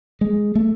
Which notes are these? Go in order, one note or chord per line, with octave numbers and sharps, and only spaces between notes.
G#3
A3